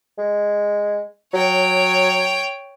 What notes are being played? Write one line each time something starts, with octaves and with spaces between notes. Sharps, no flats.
G#3
F#3 C#5 G5